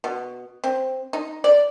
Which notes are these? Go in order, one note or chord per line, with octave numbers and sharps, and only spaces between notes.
B2
C4
D#4
D5